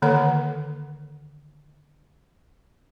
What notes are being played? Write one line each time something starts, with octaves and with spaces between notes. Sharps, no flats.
D3 D#3 A#3 A4 C#5 F#5